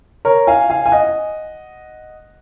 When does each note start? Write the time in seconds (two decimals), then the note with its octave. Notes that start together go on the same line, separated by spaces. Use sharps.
0.25 A#4 C#5
0.47 F5 G#5
0.70 F5 G#5
0.86 G#5
0.92 D#5 F#5